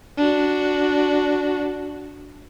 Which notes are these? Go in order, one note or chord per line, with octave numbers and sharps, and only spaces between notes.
D4 F#4